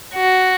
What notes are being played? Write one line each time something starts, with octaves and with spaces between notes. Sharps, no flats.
F#4